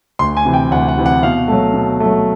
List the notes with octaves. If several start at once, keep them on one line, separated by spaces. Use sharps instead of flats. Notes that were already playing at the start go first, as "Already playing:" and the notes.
D2 C6
G#5
C3 E3
G5
D2 F#5
F#5
C3 E3
F#5
B2 F5
F#3 A3
B2
F#3 A3